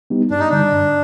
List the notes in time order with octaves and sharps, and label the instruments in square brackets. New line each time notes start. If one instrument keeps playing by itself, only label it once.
[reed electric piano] G3 B3 D#4 G4
[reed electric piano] G2 [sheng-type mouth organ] D4
[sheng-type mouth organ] D#4
[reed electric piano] D3 G3 [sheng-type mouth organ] D4
[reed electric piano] G2